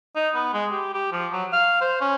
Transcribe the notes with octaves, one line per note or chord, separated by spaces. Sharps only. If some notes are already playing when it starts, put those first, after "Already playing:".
D#4
B3
G#3
G4
G4
F3
F#3
F5
C5
C#4